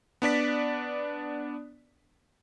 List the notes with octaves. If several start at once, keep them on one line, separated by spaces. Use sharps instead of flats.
B3 D4 D5 B6